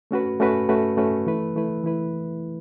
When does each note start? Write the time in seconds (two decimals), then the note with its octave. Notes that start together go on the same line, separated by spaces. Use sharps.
0.11 A3 C#4 F#4 B4
0.40 A3 C#4 F#4 B4
0.69 A3 C#4 F#4 B4
0.97 A3 C#4 F#4 B4
1.26 E3 A3 E4 B4
1.56 E3 A3 E4 B4
1.84 E3 A3 E4 B4